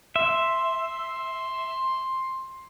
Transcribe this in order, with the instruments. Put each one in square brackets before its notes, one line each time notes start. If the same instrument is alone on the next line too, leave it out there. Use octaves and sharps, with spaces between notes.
[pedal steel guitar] E5 [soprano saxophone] C6